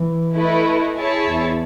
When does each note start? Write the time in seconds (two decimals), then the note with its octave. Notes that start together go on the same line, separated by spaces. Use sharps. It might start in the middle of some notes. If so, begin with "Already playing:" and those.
Already playing: E3
0.35 A3 E4 B4 D#5
0.95 E4 G#4 C#5 E5 A5
1.25 E2